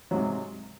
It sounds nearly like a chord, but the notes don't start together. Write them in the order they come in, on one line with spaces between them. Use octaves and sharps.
F#3 G#2 C3